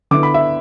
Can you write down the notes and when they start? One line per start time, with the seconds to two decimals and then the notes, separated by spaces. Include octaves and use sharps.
0.11 D3 B3 E4 D6
0.23 B5
0.34 E5